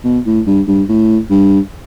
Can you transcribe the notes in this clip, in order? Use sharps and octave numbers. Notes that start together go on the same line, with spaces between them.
B2
A2
G2
G2
A2
G2